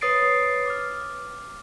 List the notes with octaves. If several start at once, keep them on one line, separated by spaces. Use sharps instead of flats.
B4 C#5 D#6 A6 C7 D7
D6 F6